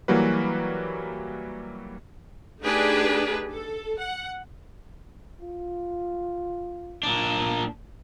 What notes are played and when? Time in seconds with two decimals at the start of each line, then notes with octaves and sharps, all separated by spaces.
0.08 E3 F#3 G3 A#3 F#4 B4
2.63 A3 D4 D#4 G4 G#4 B4
3.50 A4
3.99 F#5
5.41 F4
7.03 A#2 D4